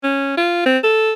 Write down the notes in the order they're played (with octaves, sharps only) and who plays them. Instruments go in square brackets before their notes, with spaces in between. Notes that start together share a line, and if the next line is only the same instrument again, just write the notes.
[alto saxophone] C#4
F4
C4
A4